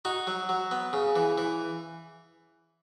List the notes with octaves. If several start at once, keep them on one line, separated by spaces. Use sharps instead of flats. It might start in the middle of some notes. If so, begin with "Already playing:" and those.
D#4 F#4
F#3
F#3
B3
C#3
E3
E3